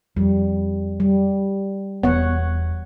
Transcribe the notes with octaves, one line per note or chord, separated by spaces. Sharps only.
F2 G3
G3
E1 E2 B3 C#5 F#5